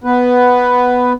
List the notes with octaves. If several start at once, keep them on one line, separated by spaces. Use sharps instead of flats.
B3 B4